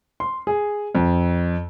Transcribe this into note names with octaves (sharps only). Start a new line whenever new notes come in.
C6
G#4
F2